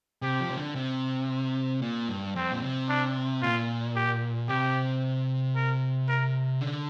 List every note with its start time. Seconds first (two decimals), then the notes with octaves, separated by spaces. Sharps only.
0.22 C3 G4
0.40 F3
0.50 C3
0.58 D3
0.76 C3
1.82 A#2
2.09 G2
2.35 F2 C4
2.51 A#2
2.62 C3
2.89 D4
3.42 A#2 F4
3.96 G4
4.49 C3 G4
5.55 A#4
6.08 A#4
6.61 D3